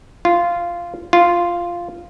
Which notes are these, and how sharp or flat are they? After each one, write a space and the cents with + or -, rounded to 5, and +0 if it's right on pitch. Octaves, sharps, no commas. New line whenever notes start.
F4 -10
F4 -5